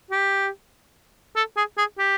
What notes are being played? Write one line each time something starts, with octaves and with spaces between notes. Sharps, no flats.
G4
A4
G#4
G#4
G4